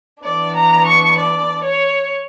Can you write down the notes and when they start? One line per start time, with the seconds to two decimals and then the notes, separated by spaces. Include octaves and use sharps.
0.23 E3 B3 D4 D5
0.53 A#5
0.85 C#6
1.16 D5
1.62 C#5